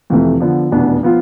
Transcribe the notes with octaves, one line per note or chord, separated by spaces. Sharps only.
F2 C3 E3 A3
D3 F3 B3
F1 E2 B2 B3 D4
F3 B3 F4